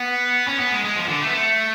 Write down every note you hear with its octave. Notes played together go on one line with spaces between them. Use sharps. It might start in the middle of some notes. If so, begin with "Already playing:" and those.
Already playing: B3
C#4
B3
G#3
G#3
F3
D3
A3
B3
A3